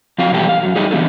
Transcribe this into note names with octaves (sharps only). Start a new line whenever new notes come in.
F3 F#3 C4 F5
B2 E3 G3 B3 G4 A4
F5
F#2 F#3
G3 A3 D#4 G4 G#4
D3 E3 A3 B3 E4 A4